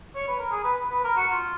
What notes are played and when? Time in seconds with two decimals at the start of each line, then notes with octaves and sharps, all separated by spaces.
0.15 C#5
0.28 B4
0.39 A#4
0.51 G#4
0.64 B4
0.90 B4
1.04 A#4
1.16 F#4
1.31 F4